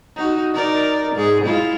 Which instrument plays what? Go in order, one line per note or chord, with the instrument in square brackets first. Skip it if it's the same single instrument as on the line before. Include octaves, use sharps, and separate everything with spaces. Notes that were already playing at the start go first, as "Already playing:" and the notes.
[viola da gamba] D#4 F#4
D#4 A#4 D5
G#2 G#4
G#3 E4 F4